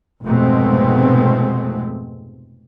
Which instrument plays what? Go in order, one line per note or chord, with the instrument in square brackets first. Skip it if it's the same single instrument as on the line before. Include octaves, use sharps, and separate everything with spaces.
[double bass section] F1 G#2 B2 G#3 A3 C4